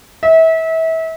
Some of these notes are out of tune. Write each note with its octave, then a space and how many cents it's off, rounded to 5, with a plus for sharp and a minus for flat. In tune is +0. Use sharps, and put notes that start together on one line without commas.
E5 -30